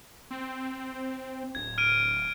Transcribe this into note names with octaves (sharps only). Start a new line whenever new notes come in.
C4
D1 G#6
F6 D7 D#7